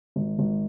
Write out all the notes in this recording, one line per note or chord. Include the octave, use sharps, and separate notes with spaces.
G#1
G#1